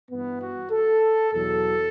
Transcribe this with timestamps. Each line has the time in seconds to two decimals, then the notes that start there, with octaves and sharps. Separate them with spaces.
0.10 G2 E3 B3
0.41 F#4
0.71 A4
1.32 E2 B2 F#3 A4